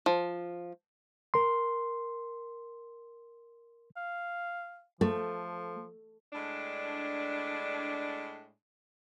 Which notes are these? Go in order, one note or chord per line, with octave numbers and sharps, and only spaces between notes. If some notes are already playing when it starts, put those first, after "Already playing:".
F3
A#4 C6
F5
F3 A3
A2 G#3 D4